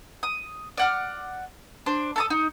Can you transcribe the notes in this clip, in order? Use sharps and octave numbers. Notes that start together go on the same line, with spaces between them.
D#6
D5 F#5 F6
D4 C5
A4 A5 D#6
D#4